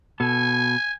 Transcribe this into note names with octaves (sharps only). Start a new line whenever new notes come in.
B2 A4 G#5